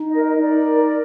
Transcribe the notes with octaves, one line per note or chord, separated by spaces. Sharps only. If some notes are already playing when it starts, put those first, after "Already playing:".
Already playing: D#4
A#4 D#5
D#5
D#4 D5
A#4
A#4